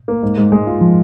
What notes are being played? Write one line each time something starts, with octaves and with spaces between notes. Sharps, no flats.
A#3
G#2
G#2
G#3
F4
F3